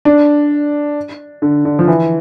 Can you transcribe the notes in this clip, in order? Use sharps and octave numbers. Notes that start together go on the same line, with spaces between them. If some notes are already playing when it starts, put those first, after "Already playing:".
D4
D3
D3
F3
E3